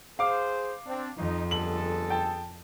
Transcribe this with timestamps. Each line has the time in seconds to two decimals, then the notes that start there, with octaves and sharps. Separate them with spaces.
0.19 G#4 C5 F5 D6
0.87 C4 D4
1.17 F2 D#4
1.51 G1 G#4 A4 F#7
2.10 G5 A5